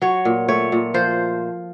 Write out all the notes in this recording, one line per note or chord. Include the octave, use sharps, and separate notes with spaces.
F#3 C#5
A#2
A3 C#5
A#2
F3 C5